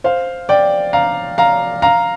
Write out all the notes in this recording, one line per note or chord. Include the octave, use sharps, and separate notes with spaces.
C5 F5
D5 G5
F5 A#5
F5 A#5
F5 A#5